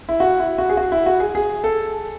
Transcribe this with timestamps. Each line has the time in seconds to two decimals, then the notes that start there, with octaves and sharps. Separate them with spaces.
0.09 E4
0.20 F#4
0.40 E4
0.58 F#4
0.69 G#4
0.77 F#4
0.92 E4
1.06 F#4
1.20 G#4
1.35 G#4
1.64 A4